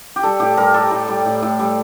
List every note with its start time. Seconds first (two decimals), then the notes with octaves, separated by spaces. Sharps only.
0.16 G4
0.23 G3 A4
0.40 A2 G4
0.57 G3 A#4
0.74 G3 A4
0.91 A2
1.08 G3
1.26 A2
1.42 A2
1.59 G3